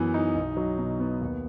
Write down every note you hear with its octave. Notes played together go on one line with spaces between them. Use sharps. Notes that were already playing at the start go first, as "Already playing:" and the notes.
Already playing: F#2 E3 B3
D#4
B1
F#3
B2
B3
D#2